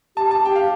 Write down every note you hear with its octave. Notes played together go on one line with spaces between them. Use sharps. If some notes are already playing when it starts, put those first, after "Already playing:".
G4 A5
A5
G4 G5
F5